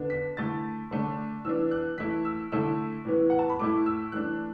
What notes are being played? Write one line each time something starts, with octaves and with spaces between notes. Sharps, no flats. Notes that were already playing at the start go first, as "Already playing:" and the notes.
Already playing: D3 B3 D4
B6
D3 A3 E4 A6
D3 A3 D4
E3 B3 D4 E6
F#6
E3 A3 E4 B6
E6
D3 A3 E4 E6
A2 E3 B3
F#5
A5
B5
A2 A3 E4 D6
E6
E3 A3 D4 F#6